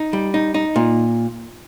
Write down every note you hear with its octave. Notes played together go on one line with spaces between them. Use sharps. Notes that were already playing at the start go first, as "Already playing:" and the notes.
Already playing: D#4
G3
D#4
D#4
A#2